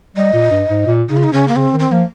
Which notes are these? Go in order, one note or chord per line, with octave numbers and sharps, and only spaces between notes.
G3 D#5
A#2
G2
G#2
A#2
C#3 D#4
F4
D#4
C#3 C#4
A#3
C#3 C4
D#3
C4
F3 A#3